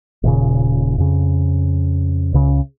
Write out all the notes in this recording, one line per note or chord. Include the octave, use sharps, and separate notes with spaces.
D#1 A#2 C#3
F2 C#3
C#2 C#3 C#4